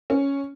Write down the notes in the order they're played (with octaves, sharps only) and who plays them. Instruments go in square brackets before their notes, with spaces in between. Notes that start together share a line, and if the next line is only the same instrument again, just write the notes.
[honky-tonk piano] C#4